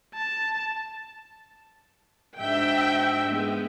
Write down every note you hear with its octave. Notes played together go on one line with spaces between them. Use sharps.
A5
G#2 D4 F#4 E5 G5
E3 G#3 B3